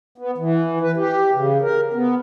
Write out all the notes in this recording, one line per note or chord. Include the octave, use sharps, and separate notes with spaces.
B3
E3
B4
G4
C#3
A#4
B3